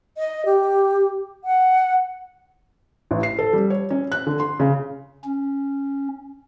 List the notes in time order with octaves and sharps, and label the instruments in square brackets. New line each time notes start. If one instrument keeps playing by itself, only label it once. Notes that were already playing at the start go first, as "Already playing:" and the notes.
[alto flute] D#5
G4
F#5
[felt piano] A1
C7
A4
G3
C#5
C#4
F#6
D3
C6
C#3
[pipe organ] C#4